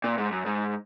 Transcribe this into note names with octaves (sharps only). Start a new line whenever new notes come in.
A#2
G#2
F#2
G#2